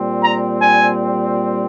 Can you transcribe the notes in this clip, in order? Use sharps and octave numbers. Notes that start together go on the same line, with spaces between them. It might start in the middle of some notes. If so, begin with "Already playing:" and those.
Already playing: A#2 G3 C4
A#5
G#5